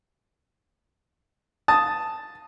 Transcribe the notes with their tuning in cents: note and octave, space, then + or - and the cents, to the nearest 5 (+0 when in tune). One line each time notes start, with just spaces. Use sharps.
A5 +0 D#6 +0